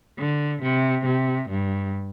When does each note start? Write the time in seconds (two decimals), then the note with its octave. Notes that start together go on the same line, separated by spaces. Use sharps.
0.19 D3
0.63 C3
1.06 C3
1.50 G2